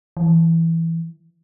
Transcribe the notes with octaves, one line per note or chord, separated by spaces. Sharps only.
E3